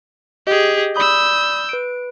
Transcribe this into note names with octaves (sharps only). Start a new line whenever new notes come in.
G4 G#4 D#5
D5 B5 D#6 E6 G6
B4 D7